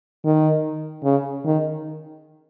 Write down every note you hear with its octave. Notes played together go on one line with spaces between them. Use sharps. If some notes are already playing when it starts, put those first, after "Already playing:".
D#3
C#3
D#3